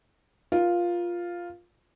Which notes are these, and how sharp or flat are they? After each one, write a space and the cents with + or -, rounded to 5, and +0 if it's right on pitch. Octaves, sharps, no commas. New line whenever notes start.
F4 +0 A#4 +40